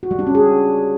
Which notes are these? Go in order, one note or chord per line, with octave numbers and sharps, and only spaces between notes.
F#4
G3
D4
C#4
G#4